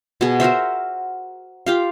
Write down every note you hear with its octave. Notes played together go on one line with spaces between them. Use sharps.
B2 G#4
F#4 A#4 C5 E5
F4 G4 F5